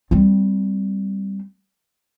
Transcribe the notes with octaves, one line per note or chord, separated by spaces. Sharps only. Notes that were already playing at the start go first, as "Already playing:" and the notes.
G3 C4